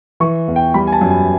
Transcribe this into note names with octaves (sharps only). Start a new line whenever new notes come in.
E3 C#6
E2
G5
G3 B5
G#5
A5
F#2
G#5